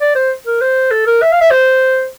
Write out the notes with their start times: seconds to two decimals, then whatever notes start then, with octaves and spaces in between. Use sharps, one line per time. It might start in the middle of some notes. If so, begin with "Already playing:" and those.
0.01 D5
0.15 C5
0.46 A#4
0.61 C5
0.91 A4
1.06 A#4
1.22 E5
1.32 F5
1.41 E5
1.51 C5